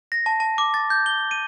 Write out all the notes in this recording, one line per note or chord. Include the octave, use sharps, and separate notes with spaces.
A#6
A5
A5
D6
A6
G6
G7
D#7